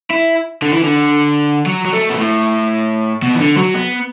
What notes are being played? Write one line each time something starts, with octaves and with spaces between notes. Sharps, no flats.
E4
D3
E3
D3
F#3
F#3
A3
B2
A2
B2
E3
D3
F#3
B3